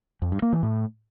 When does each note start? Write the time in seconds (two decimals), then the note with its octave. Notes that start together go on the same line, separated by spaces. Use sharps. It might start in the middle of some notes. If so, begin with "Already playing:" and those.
0.22 F2
0.32 G2
0.42 A#3
0.53 E3
0.63 A2